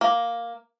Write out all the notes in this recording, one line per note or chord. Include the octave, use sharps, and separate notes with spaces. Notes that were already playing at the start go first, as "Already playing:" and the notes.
A#3